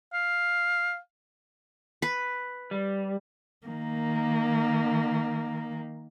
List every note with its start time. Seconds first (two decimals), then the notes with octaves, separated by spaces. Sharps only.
0.13 F5
2.02 B4
2.71 G3
3.67 D#3 A#3